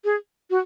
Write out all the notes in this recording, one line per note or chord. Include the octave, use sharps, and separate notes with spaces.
G#4
F#4